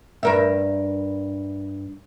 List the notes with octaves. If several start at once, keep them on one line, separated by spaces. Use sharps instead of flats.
G2 A#4 E5